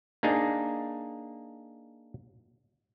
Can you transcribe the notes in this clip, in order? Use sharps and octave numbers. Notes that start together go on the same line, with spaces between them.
A#3 D4 D#4 G#4